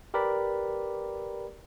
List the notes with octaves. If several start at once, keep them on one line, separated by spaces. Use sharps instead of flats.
G4 A#4 B4 D5 B5